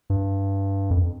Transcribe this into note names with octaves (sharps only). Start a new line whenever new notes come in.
G2
F2